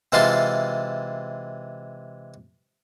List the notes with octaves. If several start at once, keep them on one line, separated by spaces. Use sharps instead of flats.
C3 E3 G#3 F4 A5 C6